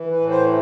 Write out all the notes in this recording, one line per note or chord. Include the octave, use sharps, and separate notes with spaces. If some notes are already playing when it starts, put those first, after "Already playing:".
Already playing: E3
B4
A2
C5